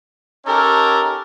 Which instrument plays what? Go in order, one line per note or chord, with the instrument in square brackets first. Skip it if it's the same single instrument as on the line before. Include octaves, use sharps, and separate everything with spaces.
[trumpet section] C#4 D#4 G4 A4 A#4